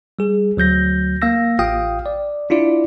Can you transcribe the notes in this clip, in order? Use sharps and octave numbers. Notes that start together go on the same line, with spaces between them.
G3 G#4
D2 F#3 G6 A#6
A#3 F5 E6 A#6
A1 F4 F5 G5 D#6
D5
D4 E4 F4 D5